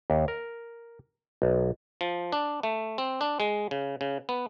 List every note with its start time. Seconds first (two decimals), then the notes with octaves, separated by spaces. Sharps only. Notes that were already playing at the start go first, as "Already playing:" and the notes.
0.10 D#2
0.28 A#4
1.42 B1
2.01 F3
2.32 D4
2.63 A3
2.98 C4
3.21 D4
3.40 G#3
3.71 C#3
4.01 C#3
4.29 B3